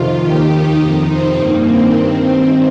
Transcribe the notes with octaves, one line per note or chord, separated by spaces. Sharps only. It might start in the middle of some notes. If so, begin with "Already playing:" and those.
Already playing: F2 C3 D#3 F4
D#2 D#3 G4
D#4
F2 C3 D#3 D#4
C4
G2 D#3 A#3
C4
G2 D#3